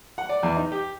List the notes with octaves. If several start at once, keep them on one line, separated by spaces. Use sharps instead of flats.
F#5
D5
E2
D#4
G4